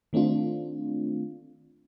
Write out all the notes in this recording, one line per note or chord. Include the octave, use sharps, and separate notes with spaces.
D#3 A3 C4 D4 F4